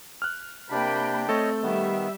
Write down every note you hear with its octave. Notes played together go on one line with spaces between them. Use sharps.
F6 F#6
C3 A#3 D4 G5 B5
A3 C4 A4 C#5 D#5
D#3 G3 B3 E5